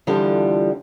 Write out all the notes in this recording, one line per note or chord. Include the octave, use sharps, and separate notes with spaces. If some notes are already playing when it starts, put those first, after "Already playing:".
F2 D3 E3 F3 G3